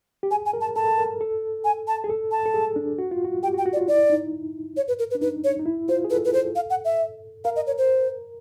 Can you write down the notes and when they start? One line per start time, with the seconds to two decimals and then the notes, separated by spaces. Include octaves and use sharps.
0.23 G4
0.31 G#4 G#5
0.46 G#5
0.53 A#4
0.61 A5
0.76 A4 A5
0.98 A#4
1.21 A4
1.64 G#5
1.88 A5
2.04 G#4
2.09 A4
2.31 A5
2.46 A4
2.54 G#4
2.76 D4
2.99 F#4
3.11 F4
3.24 F#4
3.43 G4 G5
3.54 F#4
3.58 G5
3.66 F#4
3.73 D5
3.77 F4
3.88 E4 D5
4.10 D#4
4.77 C#5
4.88 B4
4.99 A#4
5.11 B4
5.15 D4
5.21 D#4 B4
5.44 C#5
5.59 D#4
5.66 E4
5.89 F4 C5
6.05 G#4
6.10 A4 B4
6.25 B4
6.33 C5
6.56 F5
6.70 F#5
6.85 E5
7.45 A#4 F5
7.56 D#5
7.67 C#5
7.78 C5